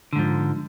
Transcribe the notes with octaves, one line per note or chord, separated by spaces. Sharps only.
G#2 D3 F3